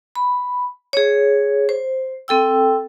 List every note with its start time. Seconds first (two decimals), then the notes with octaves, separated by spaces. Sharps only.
0.16 B5
0.93 G#4 C#5
1.69 C5
2.28 C4 A4 G5 E6